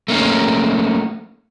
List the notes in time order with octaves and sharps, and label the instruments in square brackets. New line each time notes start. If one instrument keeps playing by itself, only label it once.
[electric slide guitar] A3 A#3 C#4